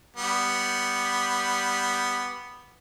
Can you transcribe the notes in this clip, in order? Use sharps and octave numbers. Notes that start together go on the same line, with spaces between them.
G3 B3